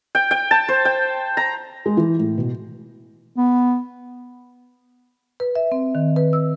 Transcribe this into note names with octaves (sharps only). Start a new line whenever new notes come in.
G5
G5
A5
C5
G5
A#5
G#3
E3
A2
B2
B3
B4
E5
C4
D#3
B4
E6